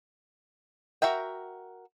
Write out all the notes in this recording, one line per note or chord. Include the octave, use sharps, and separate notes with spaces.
F#4 A#4 E5 G5